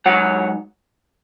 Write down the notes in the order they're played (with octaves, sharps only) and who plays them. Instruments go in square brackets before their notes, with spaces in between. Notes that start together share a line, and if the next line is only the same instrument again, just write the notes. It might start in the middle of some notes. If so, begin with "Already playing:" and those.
[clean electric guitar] G#2 F#3 C#5 F#5